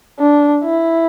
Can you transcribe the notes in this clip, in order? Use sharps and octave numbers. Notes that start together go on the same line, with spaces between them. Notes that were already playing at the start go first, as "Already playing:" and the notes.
D4
E4